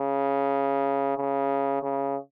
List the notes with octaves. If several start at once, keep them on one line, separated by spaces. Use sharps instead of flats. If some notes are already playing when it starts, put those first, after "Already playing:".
Already playing: C#3
C#3
C#3